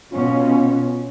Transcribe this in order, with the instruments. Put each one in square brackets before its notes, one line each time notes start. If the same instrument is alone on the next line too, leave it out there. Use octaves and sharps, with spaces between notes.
[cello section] B2 C#4 [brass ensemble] F4